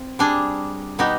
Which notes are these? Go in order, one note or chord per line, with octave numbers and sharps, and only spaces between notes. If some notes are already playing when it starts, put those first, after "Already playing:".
Already playing: C4
G3 D4 G#4
B2 B3 D#4 G4